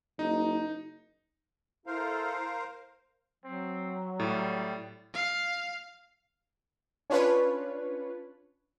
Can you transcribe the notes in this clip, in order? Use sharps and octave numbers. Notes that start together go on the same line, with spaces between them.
F#1 D#4
E4 A4 A#4 C5 F5
F#3 C4
A2 G3
F5
C#4 D4 F4 B4 C#5